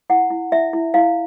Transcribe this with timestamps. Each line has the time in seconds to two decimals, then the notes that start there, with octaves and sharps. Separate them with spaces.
0.10 E4 F#5
0.30 E4
0.52 E4 E5
0.73 E4
0.94 E4 F5